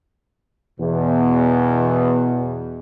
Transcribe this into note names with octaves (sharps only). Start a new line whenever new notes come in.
E2 B2